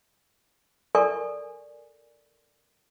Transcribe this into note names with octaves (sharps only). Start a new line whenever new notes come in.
A4 A#4 D5 G#5 C#6